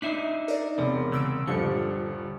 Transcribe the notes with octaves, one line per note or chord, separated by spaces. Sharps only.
D4 D#4 E5 B6 C7
A#4 D5
E1 E2 C3
C#3 E6 D7
D#1 G2 D3 F3 C#7